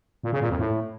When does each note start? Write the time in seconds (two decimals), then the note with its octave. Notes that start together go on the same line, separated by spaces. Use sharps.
0.24 A#2
0.32 C#3
0.41 A#2
0.50 F2
0.59 A2